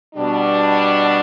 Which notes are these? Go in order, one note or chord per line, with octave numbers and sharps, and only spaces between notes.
B2 G3 D4